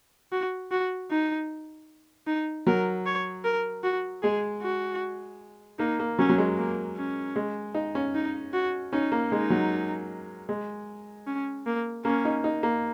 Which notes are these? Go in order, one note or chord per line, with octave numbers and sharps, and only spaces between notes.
F#4
F#4
D#4
D#4
F#3 A#4
C#5
A#4
F#4
G#3 G#4
F#4
A#3 D#4
A#3
F#3 C#4
F#3
G#3
A#3
C#4
G#3
D#4
C#4
D#4
F#4
C#4 D#4
A#3
G#3 D#4
F#3
G#3
C#4
A#3
A#3 C#4
D#4
D#4
A#3